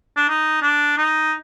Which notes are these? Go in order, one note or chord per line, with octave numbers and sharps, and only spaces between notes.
D4
D#4
D4
D#4